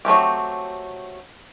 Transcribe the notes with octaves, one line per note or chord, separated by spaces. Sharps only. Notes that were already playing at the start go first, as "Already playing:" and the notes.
F#3 A3 C4 G4